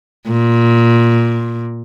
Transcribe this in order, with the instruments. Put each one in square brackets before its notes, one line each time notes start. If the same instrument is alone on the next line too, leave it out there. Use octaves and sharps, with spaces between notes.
[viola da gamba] A#2